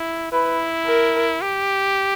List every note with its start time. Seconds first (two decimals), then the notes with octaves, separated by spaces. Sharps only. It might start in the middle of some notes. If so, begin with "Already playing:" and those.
Already playing: E4
0.32 E4 B4
0.86 A#4
1.41 G4